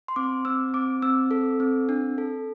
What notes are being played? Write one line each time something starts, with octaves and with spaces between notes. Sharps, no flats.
C6
C4 D6
C4 E6
C4 D6
C4 E6
A4
C4
D4
A4